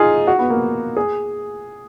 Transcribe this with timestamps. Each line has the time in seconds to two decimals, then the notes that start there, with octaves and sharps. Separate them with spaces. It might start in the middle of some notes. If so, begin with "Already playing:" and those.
Already playing: D#4 F4 G#4
0.27 F#4
0.39 B3
0.50 A#3
0.97 G#4